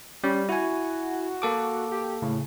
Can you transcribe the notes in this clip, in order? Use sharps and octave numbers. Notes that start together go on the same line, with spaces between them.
G3 C#4
E4 F#4 G#5
A#3 A4 D6
G4
A2 C#3